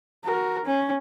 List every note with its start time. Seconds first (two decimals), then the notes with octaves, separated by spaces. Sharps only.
0.24 F#4 A#4
0.65 C#4